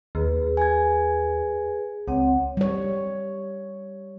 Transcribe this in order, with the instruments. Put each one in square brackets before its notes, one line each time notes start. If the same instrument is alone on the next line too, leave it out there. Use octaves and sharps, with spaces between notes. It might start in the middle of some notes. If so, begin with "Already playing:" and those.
[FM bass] D#2 [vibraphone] G#4 B4
[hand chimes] G#5 G#6
[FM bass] C#2 [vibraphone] C4 C#5 F#5
[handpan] G3 C#5